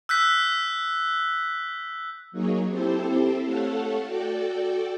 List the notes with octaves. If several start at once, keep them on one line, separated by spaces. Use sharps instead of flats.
E6 F#6 G6 B6
F#3 A#3 D#4 G#4 C#5
C4 E4 G4 A4 C5
A3 A4 C#5 F5 F#5
F#4 A4 D5 G5